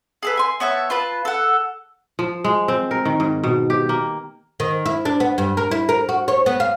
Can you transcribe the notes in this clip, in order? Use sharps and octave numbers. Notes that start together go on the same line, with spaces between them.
G#4 A4 B4
G#5 C6
B3 C#5 E5 A5
F4 B4 A5
A4 F#5
F3
G#3
C4
A#4
D#3
G#2
B2
G4
A#3
D#3
E4
D4
B3
G2
A#4
E4
A#4
F#4
C#5
B3
F5